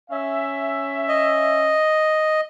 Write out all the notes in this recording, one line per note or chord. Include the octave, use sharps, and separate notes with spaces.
C#4 E5
D#5